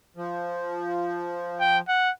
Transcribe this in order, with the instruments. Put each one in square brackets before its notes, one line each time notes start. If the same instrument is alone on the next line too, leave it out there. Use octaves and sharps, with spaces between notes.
[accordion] F3
[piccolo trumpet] G5
F#5